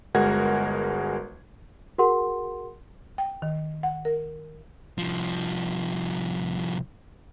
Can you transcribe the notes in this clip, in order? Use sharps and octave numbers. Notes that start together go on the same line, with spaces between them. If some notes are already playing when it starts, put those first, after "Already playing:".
G1 G#3 F#4 A#4 F#5 G#6
F#4 G#4 A#4 F#5 C6
G5
D#3
F#5
A#4
C2 F3